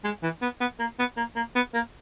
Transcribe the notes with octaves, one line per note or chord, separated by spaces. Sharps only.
G#3
E3
B3
B3
A#3
B3
A#3
A#3
B3
A#3